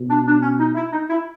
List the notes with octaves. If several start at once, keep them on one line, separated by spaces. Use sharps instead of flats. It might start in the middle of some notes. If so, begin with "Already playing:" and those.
Already playing: B2
D4
D4
C#4
D#4
E4
D#4
E4